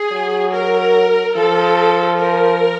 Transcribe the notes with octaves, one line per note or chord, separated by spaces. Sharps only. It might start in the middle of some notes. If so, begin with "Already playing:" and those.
Already playing: G#4
F#3
A#4
F3 A4
A#4